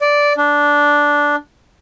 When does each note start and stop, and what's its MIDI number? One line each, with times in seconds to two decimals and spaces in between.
0.01 0.33 74
0.37 1.36 62